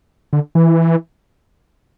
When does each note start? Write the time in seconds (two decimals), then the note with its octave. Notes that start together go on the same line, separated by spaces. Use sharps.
0.33 D3
0.55 E3